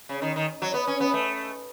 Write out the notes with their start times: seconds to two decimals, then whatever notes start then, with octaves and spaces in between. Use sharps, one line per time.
0.09 C#3
0.22 D#3
0.36 D#3
0.62 F#3
0.74 B3
0.87 C#4
1.00 B3
1.14 A3